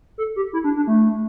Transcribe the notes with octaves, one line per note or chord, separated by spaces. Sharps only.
A4
G4
E4
D4
D4
A3